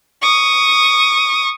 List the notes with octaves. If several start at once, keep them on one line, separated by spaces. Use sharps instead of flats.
C#6 D#6